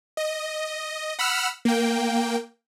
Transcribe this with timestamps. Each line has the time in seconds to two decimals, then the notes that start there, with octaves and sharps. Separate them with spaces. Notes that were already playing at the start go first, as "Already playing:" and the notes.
0.17 D#5
1.19 F#5 B5 E6 F6
1.65 A#3 G5